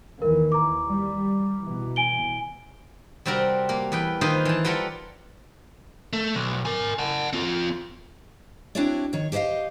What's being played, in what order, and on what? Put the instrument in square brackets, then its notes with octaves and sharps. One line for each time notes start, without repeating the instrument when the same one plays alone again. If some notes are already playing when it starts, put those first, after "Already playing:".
[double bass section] D#2 D#3 E3 [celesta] A#4
[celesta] A#5 D6
[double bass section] G3
B2 E3
[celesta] G#5 D7 G7
[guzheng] C3 G3 C4 F#4 A#4
A#3
E2 B4 G5
D#3 A#3 F4 B4 C5 D#5
E3 A5
G3 F4 A4 A#4 F#5
[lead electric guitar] A3
B1
A#4 G#5
F#5 A5
C4 F4
[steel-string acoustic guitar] C4 D4 E4 F#4 C#5 D5
D#3 C#5
G4 C5 C#5 D#5 F5